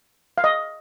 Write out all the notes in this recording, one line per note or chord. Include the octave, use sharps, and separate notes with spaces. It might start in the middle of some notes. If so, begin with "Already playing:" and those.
F5
D#5